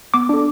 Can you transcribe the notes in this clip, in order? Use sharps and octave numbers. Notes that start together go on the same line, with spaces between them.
B3 D6
D4 A4